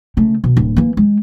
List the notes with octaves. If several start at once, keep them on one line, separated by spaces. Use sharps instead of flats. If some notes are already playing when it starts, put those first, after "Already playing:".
C#3 A3
B2
D1
E3 A#3
G#3